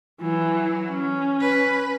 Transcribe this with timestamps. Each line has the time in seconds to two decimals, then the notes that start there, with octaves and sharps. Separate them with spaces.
0.21 E3 F#3
0.90 C#4
1.40 B4